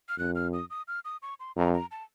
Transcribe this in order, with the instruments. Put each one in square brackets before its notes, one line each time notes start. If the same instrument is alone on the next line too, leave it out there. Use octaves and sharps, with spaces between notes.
[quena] F6
[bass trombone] F2 [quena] F#6
[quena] F6
D#6
D#6
F6
D#6
C#6
C6
[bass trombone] F2 [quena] A#5
[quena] A#5
A5